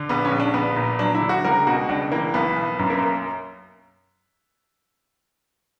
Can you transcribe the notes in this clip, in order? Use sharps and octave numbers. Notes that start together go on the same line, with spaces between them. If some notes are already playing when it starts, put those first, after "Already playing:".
Already playing: D3
A#1 B3
C#4
A#1
D4
A#1 B3
A#2
F#3 D4
E4
D3
F#4
C#2 A#4
B2 F#4
C#2 D4
E3 A#3
B1 B3
B1
F#2
A#3